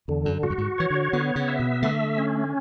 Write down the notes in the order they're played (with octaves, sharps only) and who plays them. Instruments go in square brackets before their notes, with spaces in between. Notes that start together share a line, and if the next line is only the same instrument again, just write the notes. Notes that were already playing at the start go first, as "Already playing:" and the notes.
[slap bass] E2 [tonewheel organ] D3
[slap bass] F#2
[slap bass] G#2 [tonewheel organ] F#4
[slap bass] F#2
G#2
[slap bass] E3 [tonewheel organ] C#5
[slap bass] D3
[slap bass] D3 [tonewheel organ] B3
[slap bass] C#3
[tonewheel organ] E5
[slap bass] B2
[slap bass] D3 [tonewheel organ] A3
[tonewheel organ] C#4